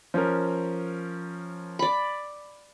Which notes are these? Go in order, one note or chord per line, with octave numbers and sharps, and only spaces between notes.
F3 C#4 A#4
D5 B5